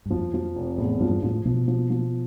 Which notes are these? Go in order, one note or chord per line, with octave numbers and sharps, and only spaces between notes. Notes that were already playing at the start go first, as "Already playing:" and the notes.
G2
F2 F3
F3
F1
E2 A2
G2 F3
A2 F3
B2 F3
F3
F3